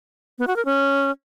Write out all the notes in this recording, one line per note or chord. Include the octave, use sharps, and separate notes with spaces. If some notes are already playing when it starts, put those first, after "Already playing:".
B3
F#4
A#4
C#4